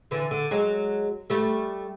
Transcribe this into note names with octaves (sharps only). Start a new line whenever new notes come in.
D3 E3
D3
F#3 G#3
G3 A3